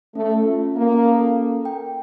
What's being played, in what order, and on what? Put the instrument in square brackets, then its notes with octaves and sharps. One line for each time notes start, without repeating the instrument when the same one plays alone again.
[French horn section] A3 [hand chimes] C#4
[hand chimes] F4
[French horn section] A#3 [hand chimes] C#4
[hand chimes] A4
A#4
G5